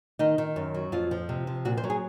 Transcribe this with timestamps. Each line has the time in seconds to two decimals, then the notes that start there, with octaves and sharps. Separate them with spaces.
0.19 D#3 D#4
0.38 D#3
0.56 F#2
0.74 F#3
0.92 F2 F4
1.11 F3
1.29 C3
1.47 F3
1.65 A#2 F#4
1.77 C5
1.84 F#3
1.90 G#4